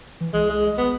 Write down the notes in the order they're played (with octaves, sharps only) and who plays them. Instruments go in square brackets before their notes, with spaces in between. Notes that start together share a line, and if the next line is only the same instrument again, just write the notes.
[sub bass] E3
[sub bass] C2 [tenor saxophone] G#3
[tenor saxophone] G#3
[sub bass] G#1 [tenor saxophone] B3